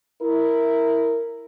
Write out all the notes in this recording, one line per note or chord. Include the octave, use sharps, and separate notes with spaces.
E4 A#4